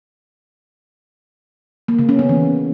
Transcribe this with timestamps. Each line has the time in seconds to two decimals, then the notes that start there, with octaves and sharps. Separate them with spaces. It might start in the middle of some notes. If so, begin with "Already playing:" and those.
1.88 A#3
1.99 C#3
2.09 C#4
2.19 B3
2.29 E3